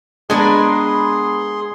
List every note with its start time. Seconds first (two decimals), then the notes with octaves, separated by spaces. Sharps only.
0.30 G#3 B3 D4 G#4 A#4 B4 G#5 C6